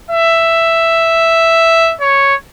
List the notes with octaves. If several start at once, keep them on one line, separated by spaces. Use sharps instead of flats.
E5
C#5